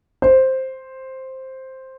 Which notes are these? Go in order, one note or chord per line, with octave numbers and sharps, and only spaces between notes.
C5